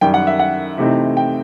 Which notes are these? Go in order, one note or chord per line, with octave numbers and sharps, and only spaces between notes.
F#2 D#3 G3 G5
F#5
E5
F#5
C3 E3 A3 C4 D#4
G5